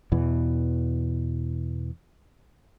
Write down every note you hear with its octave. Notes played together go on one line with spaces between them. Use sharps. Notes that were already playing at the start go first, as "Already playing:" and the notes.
E2 B2 E3